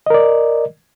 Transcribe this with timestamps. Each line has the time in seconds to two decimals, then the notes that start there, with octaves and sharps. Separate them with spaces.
0.06 D#5
0.10 A#4
0.14 D5